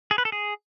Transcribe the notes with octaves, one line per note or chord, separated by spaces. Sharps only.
G#4
B4
A4
G#4